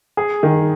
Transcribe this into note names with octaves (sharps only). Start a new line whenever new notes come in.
G#4
D#3